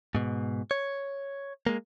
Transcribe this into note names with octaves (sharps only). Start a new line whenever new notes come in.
G#2 B2
C#5
G#3 A#3